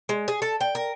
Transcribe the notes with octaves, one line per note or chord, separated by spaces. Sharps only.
G#3
G#4
A4
G5
A#4